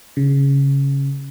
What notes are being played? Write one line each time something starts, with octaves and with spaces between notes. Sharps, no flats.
C#3